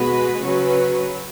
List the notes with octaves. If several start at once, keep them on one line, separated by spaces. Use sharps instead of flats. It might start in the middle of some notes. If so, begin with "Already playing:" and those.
Already playing: B2 G#3 B3 F#4 B4
C#3 F#3 C#4 F#4 B4